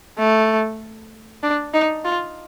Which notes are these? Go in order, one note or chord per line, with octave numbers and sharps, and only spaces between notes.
A3
D4
D#4
F4